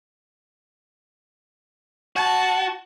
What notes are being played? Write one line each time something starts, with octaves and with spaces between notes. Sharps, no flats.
F#4 A5